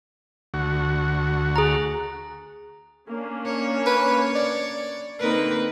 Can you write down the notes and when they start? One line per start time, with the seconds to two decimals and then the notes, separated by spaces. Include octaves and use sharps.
0.54 D2 F#4
1.56 G#4 A#5
3.08 A#3 C#4 D4
3.46 C#5
3.86 B4
4.35 D5
5.20 D3 A#3 C4 D#4 A#4 B4